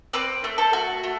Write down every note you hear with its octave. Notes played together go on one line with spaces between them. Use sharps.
C4 B4 D5
A3
A4 C5
F#4
A3